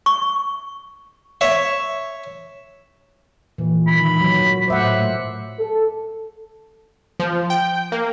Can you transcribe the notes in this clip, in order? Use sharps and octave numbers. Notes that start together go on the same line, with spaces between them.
C#6
C#5 E5
A#2 E3
G#2 D#3 B5
F#3
A2 A3 C5 E5 F#5 D6
A4
F3
G5
A#3